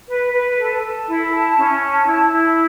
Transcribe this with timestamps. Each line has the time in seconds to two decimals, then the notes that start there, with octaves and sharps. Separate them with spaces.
0.08 B4
0.33 B4
0.58 A4
0.82 A4
1.07 E4
1.32 A5
1.57 C#4
1.81 A5
2.06 E4
2.31 E4